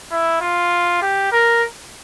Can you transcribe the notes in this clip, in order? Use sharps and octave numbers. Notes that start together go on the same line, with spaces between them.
E4
F4
G4
A#4